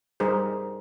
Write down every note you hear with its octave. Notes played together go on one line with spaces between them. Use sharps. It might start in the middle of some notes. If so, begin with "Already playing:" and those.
G3 D#4 G#4 A#4 C5